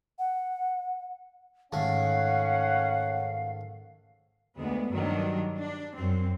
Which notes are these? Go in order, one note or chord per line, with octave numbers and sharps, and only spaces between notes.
F#5
G#2 D#3 A3 C#4 F5 F#5
D2 G#3 B3
G2 D#3 F#3 D4
D4
F#2 C4